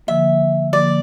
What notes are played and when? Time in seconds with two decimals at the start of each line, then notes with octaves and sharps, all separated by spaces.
0.07 D3 F3 A#3 E5
0.73 D3 F3 A#3 D5